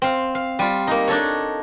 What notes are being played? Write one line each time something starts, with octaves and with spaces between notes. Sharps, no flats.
C4 F5
F5
G3 F4
A#3 D#4
D4 D#4 A4 C#5